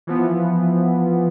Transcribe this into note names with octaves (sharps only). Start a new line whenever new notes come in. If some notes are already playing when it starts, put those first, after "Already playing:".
E3 F3 B3